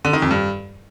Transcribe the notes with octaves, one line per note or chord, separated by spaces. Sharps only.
D3
D#3
F2
G2